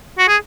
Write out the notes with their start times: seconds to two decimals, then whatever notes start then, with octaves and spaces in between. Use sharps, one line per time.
0.18 F#4
0.28 G#4